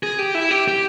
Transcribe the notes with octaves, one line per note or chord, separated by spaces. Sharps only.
G#4
G4
E4
G4
G4